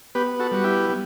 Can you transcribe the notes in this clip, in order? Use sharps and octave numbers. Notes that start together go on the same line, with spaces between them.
B3 G4 B4
F#4 A4
G3 F#4
E4 G4
G3